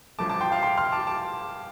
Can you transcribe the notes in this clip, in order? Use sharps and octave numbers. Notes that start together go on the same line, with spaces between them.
A1 G2 F3 A3 A5 D6
A5 D6
G5 C6
F5 A5
G5 C6
C6 F6
A5 D6
A5 D6